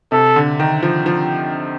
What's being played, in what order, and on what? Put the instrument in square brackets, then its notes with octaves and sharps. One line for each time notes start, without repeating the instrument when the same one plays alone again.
[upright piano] C3 [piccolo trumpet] A4
[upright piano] D3
D#3
F3
F3